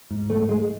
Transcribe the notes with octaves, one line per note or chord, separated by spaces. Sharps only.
G#2
A3
G#3